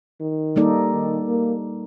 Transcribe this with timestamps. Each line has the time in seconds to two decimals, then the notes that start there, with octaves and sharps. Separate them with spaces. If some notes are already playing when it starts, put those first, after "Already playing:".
0.20 D#3
0.56 G3 A#3 D#4 A4 D5
0.92 D#3
1.28 A#3